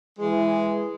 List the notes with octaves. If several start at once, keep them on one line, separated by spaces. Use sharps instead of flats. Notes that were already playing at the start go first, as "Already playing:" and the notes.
E3 G#3